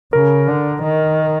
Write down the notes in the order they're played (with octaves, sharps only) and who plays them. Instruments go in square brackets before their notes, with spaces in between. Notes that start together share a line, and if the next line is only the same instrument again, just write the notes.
[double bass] C#3 [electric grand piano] A#4
[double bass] D3
D#3